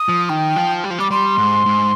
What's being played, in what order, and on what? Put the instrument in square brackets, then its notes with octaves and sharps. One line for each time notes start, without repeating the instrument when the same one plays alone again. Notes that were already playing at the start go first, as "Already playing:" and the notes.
Already playing: [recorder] D#6
[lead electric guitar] F3
[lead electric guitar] D#3 [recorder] G5
[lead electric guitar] F3
G3
F3
[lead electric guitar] G3 [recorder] D6
[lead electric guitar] G3 [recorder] C6
[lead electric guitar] G#2
G#2